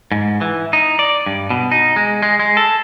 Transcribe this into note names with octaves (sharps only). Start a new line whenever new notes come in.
G#2
E3
D#4
D5
G2
B2
D#4
G#3
G#3
G#3
A4